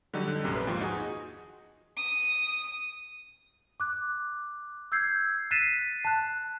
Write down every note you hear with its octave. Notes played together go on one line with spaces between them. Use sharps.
D3 F#3 G3 D#4
D3
A#1 F#2 C3
B4
D#2 G#2 F3 C6
D#4 F#4 G#4
D#6
D6 F#6
E6 G6 G#6 C7
F#6 A6 B6 C7 D#7 E7
A5 F#6